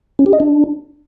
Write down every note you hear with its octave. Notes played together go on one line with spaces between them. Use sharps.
C#4
G4
D#5
D4